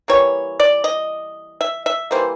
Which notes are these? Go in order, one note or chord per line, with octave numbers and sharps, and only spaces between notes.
E3 G3 A#3 C#5
D5
D#5
E5
E5
E3 G3 A#3 C5